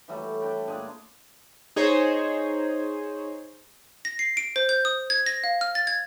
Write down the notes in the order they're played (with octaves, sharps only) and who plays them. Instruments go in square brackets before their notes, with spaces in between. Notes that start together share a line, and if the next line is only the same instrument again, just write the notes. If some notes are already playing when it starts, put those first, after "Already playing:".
[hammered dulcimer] E3 F#3 G3 A3
D4 G5 B5
A#2 G#3 D4 G#4
[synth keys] D#4 G#4 C5 C#5 D#5
[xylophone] A#6
C7
D7
C5
G6
D#6
G#6
A#6
F5
F6
A6
G#6